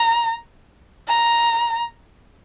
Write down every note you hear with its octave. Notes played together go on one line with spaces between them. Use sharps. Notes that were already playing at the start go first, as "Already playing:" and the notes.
Already playing: A#5
A#5